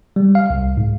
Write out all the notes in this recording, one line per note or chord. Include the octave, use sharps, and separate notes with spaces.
G3
F5
C2
G#2